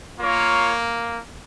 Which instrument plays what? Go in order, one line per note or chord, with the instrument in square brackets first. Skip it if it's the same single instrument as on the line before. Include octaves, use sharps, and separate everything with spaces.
[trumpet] A#3 [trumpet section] F4 A#4 C#5